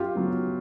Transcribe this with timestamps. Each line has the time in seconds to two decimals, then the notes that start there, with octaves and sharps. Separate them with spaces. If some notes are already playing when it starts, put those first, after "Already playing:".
Already playing: F#2 F4 G4
0.15 C#3 F#3 B3